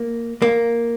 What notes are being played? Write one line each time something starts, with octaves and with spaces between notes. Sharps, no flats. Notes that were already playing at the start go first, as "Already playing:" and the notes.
Already playing: A#3
A#3